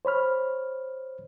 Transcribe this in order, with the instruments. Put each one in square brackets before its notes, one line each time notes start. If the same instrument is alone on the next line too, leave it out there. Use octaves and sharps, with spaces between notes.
[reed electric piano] C5 C#5 B5 F6